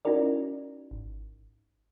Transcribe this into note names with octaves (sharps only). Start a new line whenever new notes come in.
C#4 D#4 E4 F#4 A#4 D5
G#1